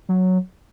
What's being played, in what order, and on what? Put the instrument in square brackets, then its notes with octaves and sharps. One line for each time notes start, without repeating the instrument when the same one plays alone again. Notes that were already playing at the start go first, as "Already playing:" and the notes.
[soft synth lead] F#3